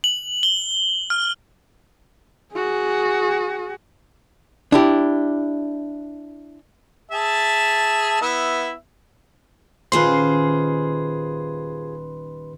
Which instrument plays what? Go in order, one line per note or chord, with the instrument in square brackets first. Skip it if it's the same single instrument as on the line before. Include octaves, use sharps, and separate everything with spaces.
[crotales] F#7
G7
F6
[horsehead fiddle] F#4 G#4
[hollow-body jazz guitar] D4 E4 G4
[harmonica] G#4 E5 A5
B3 E4 E5
[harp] D#1 D#3 C#4 [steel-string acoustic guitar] F4 G#4 C5 [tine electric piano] B4 C6